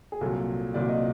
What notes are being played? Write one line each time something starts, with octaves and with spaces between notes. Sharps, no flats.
G#4
C2 A#2 F#3 A4
C2 A#2 F#3 D5
D#5